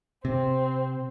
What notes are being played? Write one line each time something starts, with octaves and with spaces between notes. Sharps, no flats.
C3 C4